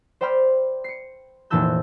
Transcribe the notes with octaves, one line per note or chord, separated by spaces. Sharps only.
C5 D5 G5 B5 F6
C7 C#7
F1 A#2 E3 A5 E6 G6